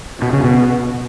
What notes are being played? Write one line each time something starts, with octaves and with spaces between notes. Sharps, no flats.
B2
C#3
B2